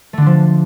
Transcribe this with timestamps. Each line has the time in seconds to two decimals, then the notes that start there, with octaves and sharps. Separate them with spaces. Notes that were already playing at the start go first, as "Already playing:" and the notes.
0.13 A3
0.18 D3
0.22 D4
0.26 F3